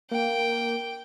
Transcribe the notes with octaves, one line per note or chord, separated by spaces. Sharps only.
A#3 G5